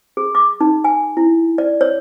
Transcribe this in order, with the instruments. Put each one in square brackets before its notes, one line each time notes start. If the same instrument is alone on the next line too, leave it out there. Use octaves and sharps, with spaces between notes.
[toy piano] G#4
D6
D#4
G#5
E4
D5
C#5